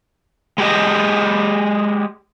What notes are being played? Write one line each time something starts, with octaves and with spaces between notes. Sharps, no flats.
G#3 G4 D#5